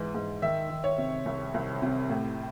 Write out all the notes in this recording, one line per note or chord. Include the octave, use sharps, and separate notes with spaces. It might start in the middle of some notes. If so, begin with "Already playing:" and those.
Already playing: G#2 E3
G#2
D#3 E5
D#3
C#5
C3
C2
C2
C3
A2